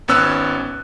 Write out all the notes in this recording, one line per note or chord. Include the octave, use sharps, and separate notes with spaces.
G#1 B3 C#4 E6 F#6